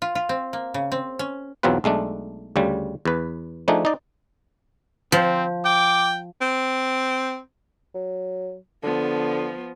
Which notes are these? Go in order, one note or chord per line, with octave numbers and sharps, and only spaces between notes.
F4
F4
C4
A#3
C#3
C4
C#4
B1 E2 F#3 C4 F4 B4
B1 G#3 A3 D4
D2 C#3 G3
E2 B4
F3 A3 D4 D#4 G#4
D#4 D5
F3 C4
G5 D6
C4
F#3
D3 F3 B3